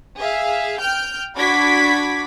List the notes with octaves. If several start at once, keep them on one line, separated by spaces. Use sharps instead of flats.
G#4 E5 F5
G5 F6 G6
D4 F#4 B5 D6 G#6 B6